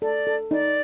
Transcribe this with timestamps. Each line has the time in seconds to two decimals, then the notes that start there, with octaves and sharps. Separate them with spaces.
0.02 A4 D5
0.27 A4
0.51 D#4 D5